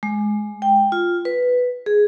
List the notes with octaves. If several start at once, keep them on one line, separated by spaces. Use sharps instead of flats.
G#3
G5
F4
B4
G#4